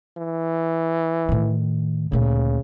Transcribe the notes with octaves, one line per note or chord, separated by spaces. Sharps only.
E3
A2 D#3
D2 A#2 C#3